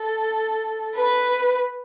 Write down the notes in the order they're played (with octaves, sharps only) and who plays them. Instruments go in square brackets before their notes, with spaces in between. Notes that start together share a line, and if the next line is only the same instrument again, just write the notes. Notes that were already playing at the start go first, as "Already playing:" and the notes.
Already playing: [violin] A4
B4